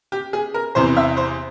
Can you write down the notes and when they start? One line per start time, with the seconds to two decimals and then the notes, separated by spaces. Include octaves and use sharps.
0.12 G4
0.33 G#4
0.54 A#4
0.75 E2 C3 E3 C5
0.97 E5
1.17 C5